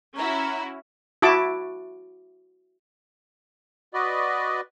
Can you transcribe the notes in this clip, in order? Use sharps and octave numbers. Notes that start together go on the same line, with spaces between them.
C#4 E4 F#4 A#5
E4 F#4 A5 D6
F#4 B4 D5 D#5